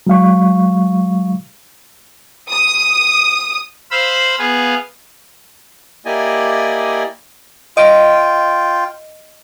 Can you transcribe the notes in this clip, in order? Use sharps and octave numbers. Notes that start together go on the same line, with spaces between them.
F#3 G#3 F5 C#6
D#6
C5 F5 B5 E6
B3 G#4 F5
A#3 E4 G4 D5 D#5 G#5
F4 D#5 G5 D7